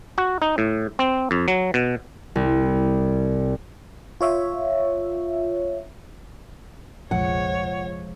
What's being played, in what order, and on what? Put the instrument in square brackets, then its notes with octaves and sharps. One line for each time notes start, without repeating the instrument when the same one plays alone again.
[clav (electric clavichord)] F#4
D#4
A2
C4
F2
F#3
B2
[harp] C2
[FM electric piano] F4 C#5 E5
[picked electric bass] F1 A#1 [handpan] F3 G#3 [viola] C#5 [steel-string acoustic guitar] F#5